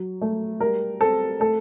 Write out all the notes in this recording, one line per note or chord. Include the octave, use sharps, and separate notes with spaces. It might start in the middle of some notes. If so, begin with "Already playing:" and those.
Already playing: F#3
A3
G3 A#4
C4 A4
A3 A4